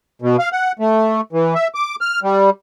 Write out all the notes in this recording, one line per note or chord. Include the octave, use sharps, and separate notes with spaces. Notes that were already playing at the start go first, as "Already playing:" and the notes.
B2
F5
F#5
A3
E3
E5
D6
F6
G3